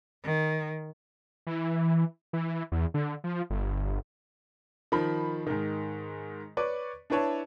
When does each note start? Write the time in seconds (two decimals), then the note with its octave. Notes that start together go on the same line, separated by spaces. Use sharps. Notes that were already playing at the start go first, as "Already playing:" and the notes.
0.24 D#3
1.47 E3
2.33 E3
2.72 E2
2.94 D3
3.24 F3
3.50 G1
4.92 D#3 F3 B5
5.47 G#2 D#3
6.57 B4 C#5 D5 C#6 D6
7.10 D4 E4 B4 C#5 A5